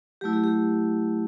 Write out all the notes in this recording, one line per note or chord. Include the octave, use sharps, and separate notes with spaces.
F#3 A3 E4 G4
G4
G4